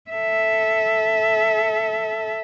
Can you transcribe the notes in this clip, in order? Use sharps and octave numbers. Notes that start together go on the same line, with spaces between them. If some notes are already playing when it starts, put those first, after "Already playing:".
A4 E5